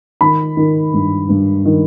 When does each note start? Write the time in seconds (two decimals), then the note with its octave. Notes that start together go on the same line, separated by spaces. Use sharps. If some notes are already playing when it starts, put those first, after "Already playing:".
0.21 D#3 B5
0.57 D#3
0.94 G2
1.29 G2
1.65 D#3